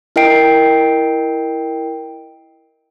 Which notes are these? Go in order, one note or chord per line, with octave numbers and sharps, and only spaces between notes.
E4 A#4 D#5 G5 C7 D7